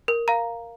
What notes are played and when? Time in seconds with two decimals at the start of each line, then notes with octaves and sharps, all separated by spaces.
0.08 A#4
0.28 F5 A#5